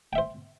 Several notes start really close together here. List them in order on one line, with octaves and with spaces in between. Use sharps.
G5 E5 C5